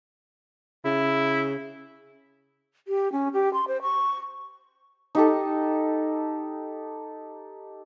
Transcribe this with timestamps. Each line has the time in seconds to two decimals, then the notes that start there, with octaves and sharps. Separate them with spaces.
0.85 C#3 E4
2.88 G4
3.12 C#4
3.33 G4
3.53 C6
3.68 C5
3.82 C#6
5.15 D#4 G4 A4